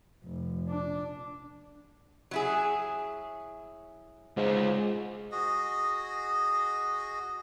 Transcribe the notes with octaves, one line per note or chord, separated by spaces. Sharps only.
F1
D4
F#3 E4 G#4
G#2 G#3 F4
F#4 G#4 D#5